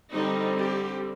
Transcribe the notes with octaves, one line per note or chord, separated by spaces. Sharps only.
D3 G3 C4 D#4
G4